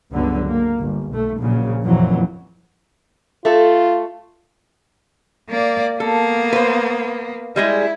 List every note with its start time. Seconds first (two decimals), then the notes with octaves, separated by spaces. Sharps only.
0.12 G1 C#2 D3 F#3 B3
0.47 A#3
0.80 G1
1.10 B1 A3
1.39 A#1 A#2 C#3 F#3
1.85 F#1 F2 A#2 E3 F#3
3.45 A3 F4 A4
5.49 A#3 D5
6.00 A#3 B3 A4
6.53 B4 C5
7.56 G3 G#3 E4 G#4